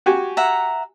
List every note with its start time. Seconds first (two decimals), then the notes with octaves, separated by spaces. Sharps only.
0.06 F#4 G4 G#5
0.37 E5 F#5 A#5